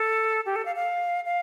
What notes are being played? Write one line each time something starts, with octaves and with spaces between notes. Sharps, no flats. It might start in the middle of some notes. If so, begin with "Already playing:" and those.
Already playing: A4
G4
A4
F5
F5
F5